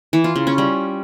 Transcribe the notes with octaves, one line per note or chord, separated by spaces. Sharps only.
E3
F4
C#3
C#4
G3